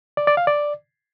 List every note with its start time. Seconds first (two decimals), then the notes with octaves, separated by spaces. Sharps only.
0.17 D5
0.27 D5
0.37 F5
0.47 D5